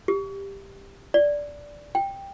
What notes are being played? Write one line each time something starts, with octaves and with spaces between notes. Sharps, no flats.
G4
D5
G5